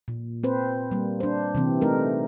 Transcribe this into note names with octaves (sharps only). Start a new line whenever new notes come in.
A#2
C4 B4 C5
G3 A#3
D4 C5
C3 E3 C4
A3 D#4 A#4